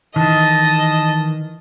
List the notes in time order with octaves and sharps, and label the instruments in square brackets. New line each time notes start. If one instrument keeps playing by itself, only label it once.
[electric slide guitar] D#3 E3 [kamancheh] D#5 [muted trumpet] A5